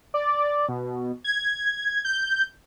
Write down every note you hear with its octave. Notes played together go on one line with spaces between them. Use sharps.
D5
B2
G#6
G6